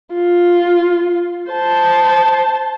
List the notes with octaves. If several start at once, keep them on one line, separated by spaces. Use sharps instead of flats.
F4
C5 A5